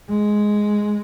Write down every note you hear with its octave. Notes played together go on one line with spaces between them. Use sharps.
G#3